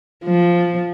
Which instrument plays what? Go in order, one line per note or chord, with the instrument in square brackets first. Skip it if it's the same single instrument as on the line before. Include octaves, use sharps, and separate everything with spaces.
[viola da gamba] F3